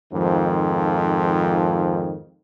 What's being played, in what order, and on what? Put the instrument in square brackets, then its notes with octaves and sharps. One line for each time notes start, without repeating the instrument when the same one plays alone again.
[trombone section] F2 G#2 D#3 F3